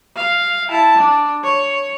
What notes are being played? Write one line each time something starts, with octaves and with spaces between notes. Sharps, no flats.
F5
E4 A5
D4
C#5